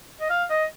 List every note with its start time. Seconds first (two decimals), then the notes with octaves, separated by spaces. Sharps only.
0.20 D#5
0.30 F5
0.50 D#5